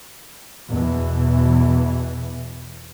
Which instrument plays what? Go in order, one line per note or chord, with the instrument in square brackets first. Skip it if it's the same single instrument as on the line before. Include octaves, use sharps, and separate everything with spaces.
[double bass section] E2 B2 E3